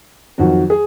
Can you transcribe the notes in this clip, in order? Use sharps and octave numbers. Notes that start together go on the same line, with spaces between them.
F2 D#3 F#3 F#4
G#4